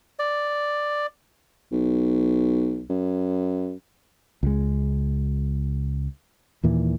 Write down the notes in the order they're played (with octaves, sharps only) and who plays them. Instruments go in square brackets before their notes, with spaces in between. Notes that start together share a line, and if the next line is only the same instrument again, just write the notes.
[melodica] D5
[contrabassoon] B1
F#2
[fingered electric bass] C#2 G#3
D#2 A#2 E3